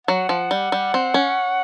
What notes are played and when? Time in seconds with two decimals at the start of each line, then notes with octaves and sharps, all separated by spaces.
0.07 F#3 F#5
0.29 F3
0.51 G3
0.72 G3
0.94 C4
1.14 C#4